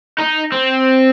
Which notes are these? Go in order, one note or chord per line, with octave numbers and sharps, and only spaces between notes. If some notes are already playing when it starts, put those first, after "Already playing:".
D#4
C4